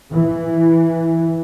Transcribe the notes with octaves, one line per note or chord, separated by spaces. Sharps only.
E3